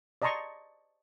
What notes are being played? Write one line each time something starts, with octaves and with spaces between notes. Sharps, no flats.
D5 D#5 A5 A#5 C6 C#6